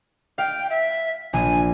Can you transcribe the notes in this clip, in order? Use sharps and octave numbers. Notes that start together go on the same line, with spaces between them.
F5 G5
E5
A#1 G#5